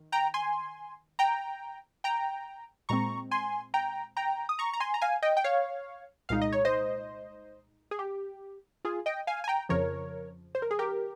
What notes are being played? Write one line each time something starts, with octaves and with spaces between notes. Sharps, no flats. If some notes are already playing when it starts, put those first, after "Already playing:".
Already playing: D#3
G5 A#5
G#5 C6
G5 A#5
G5 A#5
A#2 G#3 C4 A#5 C#6
G#5 C6
G5 A#5
G5 A#5
D#6
A#5 C#6
A#5
G#5 C6
A#5
F5 G#5
D#5 G5
G5
C#5 F5
C2 A#2 G#3 D#4 F5
D#5
C#5
C5 D#5
G#4
G4
F4 G#4
D#5 G5
F5 G#5
G#5
G5 A#5
F2 C#3 F3 A#4 C#5
C5
A#4
G#4
G4 A#4